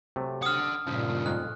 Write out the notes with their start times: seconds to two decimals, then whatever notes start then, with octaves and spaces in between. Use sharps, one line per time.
0.16 C3 F#3 A3
0.43 D4 F#5 D#6 F6
0.87 G2 A#2 C#3 F3
1.26 F2 D#3 G#3 F#6